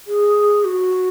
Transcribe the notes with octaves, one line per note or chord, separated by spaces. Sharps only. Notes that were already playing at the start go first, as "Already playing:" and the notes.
G#4
F#4